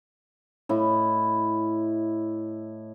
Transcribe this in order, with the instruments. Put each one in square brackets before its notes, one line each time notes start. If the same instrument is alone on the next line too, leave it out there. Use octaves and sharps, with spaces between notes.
[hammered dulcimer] A2 E4 D#5